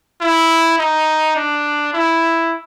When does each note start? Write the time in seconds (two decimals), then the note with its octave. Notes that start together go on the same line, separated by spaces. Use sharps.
0.21 E4
0.79 D#4
1.36 D4
1.94 E4